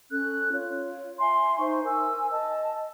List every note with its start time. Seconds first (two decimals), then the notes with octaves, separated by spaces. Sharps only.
0.10 C#4 A4 F#6
0.53 F4 C#5
1.19 E5 G#5 C6
1.59 D#4 C5 E5 C#6
1.84 A#4 G#5 E6
2.30 D#5 A5